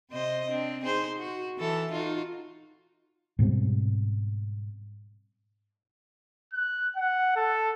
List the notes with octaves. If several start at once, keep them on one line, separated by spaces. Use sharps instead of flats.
C3 C5 D#5
C4 D4
D#4 G#4 C5
F#4
E3 A4
D#4 F4 F#4
G#2 B2 G3 C4
F#6
F#5
A4